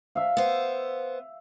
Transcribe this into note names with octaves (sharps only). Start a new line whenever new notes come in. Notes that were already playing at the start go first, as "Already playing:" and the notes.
E5 F5
B3 C5